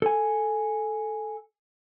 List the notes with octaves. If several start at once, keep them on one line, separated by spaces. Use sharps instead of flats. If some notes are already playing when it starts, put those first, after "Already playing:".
A4 G#5